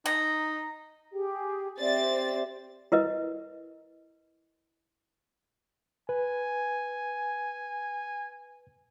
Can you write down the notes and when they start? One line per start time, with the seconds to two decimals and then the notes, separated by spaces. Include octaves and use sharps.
0.06 D#4 A#5
1.13 G4 G#4 G5
1.80 C4 G4 D5 E5 A6
2.92 E4 A#4 B4 D#5
6.09 B4 G#5